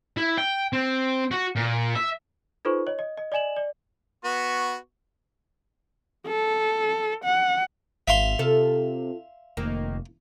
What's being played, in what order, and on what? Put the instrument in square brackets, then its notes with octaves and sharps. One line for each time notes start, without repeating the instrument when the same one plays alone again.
[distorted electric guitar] E4
G5
C4
F#4
A#2
E5
[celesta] D#4 F4 A4 B4 C5 C#6
C#5 D#5
D#5
D#5
D5 D#5 G#5 E7 F#7
D5
[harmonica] B3 F#4 C#6
[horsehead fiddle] A4
F#5
[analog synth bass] G#1 [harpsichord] E5 F5 C6
[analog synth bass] C3 [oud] F4 A4
[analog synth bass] F1 [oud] D#3 A#3